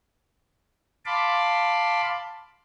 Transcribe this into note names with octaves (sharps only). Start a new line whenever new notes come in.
F5 A5 B5 C6 D6